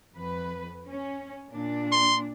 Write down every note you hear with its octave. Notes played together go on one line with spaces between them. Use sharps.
F2 B4
C#4
A#2 D4
C6